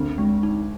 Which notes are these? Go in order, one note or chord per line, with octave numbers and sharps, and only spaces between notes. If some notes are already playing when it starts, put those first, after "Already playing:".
Already playing: D2 D3 C4
G#3
D#4